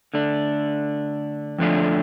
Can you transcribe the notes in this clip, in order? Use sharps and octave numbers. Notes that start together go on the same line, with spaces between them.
D3 A3 D4
F2 D3 F3 A3 D4